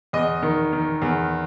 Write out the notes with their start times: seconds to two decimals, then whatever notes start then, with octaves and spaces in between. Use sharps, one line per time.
0.13 E2 D#5
0.42 D#3
0.73 D#3
1.02 E2